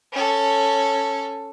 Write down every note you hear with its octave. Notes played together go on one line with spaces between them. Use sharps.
C#4 A4